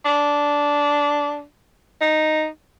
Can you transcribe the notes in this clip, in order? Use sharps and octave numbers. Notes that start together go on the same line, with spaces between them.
D4
D#4